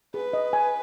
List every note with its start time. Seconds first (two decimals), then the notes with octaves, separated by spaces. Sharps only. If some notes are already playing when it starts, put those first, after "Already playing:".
0.14 G#4 B4
0.33 D#5
0.53 G#5